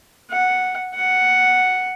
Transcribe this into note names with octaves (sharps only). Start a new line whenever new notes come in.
F#5
F#5